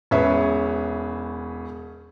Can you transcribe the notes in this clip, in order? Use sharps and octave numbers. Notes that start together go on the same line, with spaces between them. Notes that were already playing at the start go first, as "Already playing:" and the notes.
E1 C#4 G#4 B4 E5